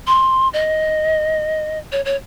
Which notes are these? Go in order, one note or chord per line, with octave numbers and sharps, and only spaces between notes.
C6
D#5
C#5
C#5